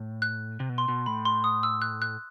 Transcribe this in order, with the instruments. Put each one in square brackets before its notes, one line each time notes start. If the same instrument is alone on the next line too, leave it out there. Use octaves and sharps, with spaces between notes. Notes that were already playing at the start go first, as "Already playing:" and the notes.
Already playing: [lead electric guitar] A2
[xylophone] F#6
[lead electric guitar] C3
B2
[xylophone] C6
[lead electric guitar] B2
[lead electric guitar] A2 [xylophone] B5
[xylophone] C6
D#6
E6
F#6
F#6